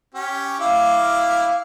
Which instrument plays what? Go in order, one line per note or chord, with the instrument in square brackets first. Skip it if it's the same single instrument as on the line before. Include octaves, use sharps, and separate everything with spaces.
[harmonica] C#4 G4
[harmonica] E4 D6 [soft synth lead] F5